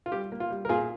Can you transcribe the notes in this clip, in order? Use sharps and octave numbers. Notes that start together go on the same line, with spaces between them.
F4
G3 G4
A#3
F4
G3
A#4
A#2 F4 G#4